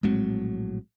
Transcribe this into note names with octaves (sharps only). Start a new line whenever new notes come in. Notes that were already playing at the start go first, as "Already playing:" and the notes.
A#1 A2 F#3 G#3 B3 C4